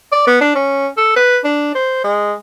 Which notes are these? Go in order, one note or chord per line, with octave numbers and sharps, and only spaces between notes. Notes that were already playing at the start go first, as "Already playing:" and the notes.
D5
B3
D4
C#4
A4
B4
D4
C5
G#3